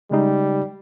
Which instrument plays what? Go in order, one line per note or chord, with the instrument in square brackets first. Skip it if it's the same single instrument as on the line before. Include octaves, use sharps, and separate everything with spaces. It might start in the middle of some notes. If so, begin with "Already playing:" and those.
[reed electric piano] C#3 G#3 D#4 [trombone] G3